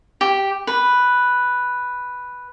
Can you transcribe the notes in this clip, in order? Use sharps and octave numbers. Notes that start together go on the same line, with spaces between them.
G4
B4